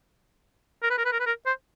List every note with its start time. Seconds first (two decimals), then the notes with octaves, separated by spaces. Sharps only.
0.83 A#4
0.90 B4
0.98 A#4
1.05 B4
1.13 A#4
1.20 B4
1.26 A#4
1.46 C5